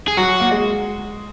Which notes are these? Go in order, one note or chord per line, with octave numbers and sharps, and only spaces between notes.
G#4
F#3 F#4
A#3
G#3